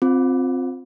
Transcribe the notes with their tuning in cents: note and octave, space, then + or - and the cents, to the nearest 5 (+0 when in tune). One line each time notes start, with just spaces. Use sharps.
C4 +0 F4 +25